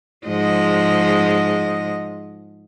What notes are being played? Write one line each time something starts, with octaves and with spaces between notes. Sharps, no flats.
G#2 F3 D#5